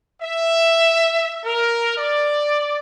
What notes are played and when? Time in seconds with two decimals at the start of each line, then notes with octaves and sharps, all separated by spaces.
0.22 E5
1.45 A#4
1.97 D5